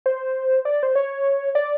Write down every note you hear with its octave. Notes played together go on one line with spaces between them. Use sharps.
C5
D5
C5
C#5
D5